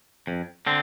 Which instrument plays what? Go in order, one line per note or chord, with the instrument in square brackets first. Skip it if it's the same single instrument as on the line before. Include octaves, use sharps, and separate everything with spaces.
[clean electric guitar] F2
D3 C4